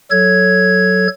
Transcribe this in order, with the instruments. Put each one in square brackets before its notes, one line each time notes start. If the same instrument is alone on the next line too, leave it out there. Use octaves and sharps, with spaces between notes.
[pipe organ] F#3 A4 C#5 G#6